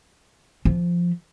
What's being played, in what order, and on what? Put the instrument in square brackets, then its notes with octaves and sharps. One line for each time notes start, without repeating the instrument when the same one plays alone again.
[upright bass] F3